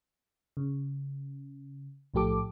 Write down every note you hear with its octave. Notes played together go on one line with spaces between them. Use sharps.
C#3
B1 A2 F3 G4 A4 D6